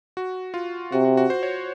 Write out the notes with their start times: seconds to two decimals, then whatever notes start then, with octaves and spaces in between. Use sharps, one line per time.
0.17 F#4
0.54 F4
0.92 C3 F#4
1.05 F#4
1.17 F#4
1.30 C5
1.43 C#5